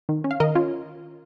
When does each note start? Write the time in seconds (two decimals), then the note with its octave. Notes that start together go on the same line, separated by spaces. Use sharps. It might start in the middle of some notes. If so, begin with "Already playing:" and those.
0.09 D#3
0.24 C#4
0.31 F5
0.40 D#3 A#4 D#5
0.55 C#4 F4